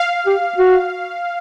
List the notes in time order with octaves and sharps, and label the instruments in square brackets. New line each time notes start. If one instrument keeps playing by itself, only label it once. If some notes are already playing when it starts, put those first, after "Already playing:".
Already playing: [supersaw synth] F5
[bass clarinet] G4
F#4